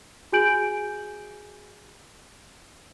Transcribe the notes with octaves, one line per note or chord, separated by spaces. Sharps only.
F#4 G#4 G#5 G6 D7 F#7